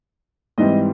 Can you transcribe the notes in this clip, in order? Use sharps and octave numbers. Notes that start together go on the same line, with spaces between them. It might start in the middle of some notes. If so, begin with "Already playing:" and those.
G#2 E3 G3 C4 D#5